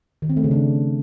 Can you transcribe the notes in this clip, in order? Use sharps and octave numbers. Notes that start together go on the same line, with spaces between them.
D#3
C4
A3
C#3
D4